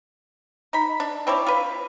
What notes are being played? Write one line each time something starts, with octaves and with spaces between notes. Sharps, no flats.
D#4 B5
D4
C4 E4 C#5 D5
F4 B4